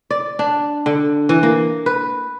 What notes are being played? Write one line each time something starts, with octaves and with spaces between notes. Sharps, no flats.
D5
D4
D3
E3
A#3
B4